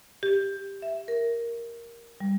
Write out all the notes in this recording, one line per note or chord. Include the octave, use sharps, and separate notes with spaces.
G4
E5
A#4
G3